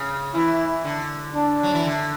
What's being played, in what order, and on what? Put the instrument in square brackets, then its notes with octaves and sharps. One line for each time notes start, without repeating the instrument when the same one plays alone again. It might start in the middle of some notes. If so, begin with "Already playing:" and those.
Already playing: [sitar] C#3
[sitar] E3 [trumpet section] E4
[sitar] D3
[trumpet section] D4
[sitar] F#3
E3
D3